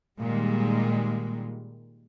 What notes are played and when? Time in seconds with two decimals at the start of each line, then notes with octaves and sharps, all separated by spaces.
0.20 A#2 D#3 G3 G#3